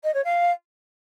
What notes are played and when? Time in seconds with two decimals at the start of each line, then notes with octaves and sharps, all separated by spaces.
0.03 D#5
0.14 C#5
0.24 F5